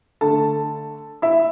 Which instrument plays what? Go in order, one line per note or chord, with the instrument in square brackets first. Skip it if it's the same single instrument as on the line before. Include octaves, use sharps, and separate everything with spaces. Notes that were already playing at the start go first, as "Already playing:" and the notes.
[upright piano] D3 A3 A4 A5
E4 E5